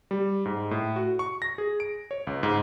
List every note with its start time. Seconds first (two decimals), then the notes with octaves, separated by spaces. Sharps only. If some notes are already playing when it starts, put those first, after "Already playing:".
0.11 G3
0.45 G#2
0.71 A2
0.96 F#4
1.19 C#6
1.42 A#6
1.58 G#4
1.80 D7
2.11 C#5
2.27 C#2
2.43 G#2